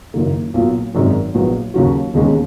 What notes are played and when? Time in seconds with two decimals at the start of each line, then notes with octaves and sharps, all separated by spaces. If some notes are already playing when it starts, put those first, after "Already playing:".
0.14 F#1 F#2 D#3 A#3
0.54 B1 A#2 F#3
0.95 G#1 F#2 D#3 G#3
1.34 A#1 A#2 F#3 B3
1.74 D#2 C#3 F#3 C#4 F#4
2.14 E1 D#2 D#3 G#3 C#4